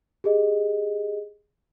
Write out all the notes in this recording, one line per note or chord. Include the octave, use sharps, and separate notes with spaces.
G4 G#4 D#5